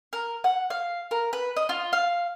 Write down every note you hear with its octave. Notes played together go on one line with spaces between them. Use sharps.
A#4
F#5
F5
A#4
B4
D#5
F4
F5